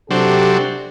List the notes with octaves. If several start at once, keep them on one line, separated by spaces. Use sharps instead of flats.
C3 F#3 C4 D4 G4 A4